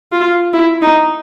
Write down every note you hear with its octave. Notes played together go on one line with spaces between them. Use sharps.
F4
E4
D#4